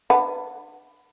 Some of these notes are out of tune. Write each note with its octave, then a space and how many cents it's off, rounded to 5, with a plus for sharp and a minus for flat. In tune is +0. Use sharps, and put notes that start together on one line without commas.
D4 +35 B4 +20 F#5 +0